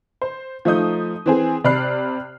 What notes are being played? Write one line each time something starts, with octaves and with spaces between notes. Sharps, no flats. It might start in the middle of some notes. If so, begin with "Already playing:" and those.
C5
F3 A3 D#4 D#6 G6
E3 C4 G#4
C3 D5 B5 F6 F#6 C7